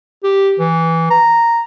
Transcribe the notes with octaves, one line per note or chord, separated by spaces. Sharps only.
G4
E3
A#5